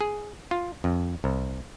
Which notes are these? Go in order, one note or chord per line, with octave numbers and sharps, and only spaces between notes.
G#4
F4
F2
C2